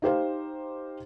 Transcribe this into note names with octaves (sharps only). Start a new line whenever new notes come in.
D#4 G4 C5 F5